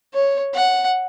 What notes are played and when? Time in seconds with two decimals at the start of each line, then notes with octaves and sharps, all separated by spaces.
0.14 C#5
0.54 F#5